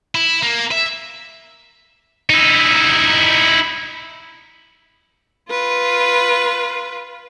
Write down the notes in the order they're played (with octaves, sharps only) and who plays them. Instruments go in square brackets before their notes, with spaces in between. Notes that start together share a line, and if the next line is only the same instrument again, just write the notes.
[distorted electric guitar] E4
A#3
E5
D#4 E4
[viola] F4 B4